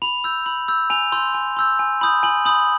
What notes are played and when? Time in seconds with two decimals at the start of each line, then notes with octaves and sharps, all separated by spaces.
0.02 B5 F7
0.24 E6 G6
0.46 B5
0.68 E6 G6
0.90 G#5 F7
1.12 C6 E6 G6
1.34 G#5
1.57 C6 E6 G6
1.79 G#5
2.01 B5 D#6 G6
2.23 G#5 F#7
2.45 B5 D#6 G6 F#7